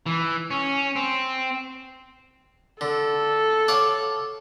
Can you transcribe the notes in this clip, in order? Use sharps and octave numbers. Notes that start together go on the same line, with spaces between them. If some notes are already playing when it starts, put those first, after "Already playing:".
E3
C#4
C4
D3 A4
C#5 F5 F#5 D6